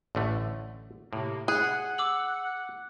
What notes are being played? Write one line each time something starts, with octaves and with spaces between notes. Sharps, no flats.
A1 D3 A3
A2 C3 A#3
G#4 F#5 F#6 G#6
D6 E6 F#7